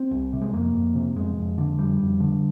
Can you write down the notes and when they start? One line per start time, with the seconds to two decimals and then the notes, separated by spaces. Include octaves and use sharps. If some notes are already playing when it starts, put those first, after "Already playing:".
Already playing: C4
0.11 C2
0.33 C3
0.41 G#3
0.53 F2 A#3
0.74 F2
0.95 C3
1.16 F2 G#3
1.36 F2
1.58 D3
1.77 F2 G3
2.00 F2
2.20 D3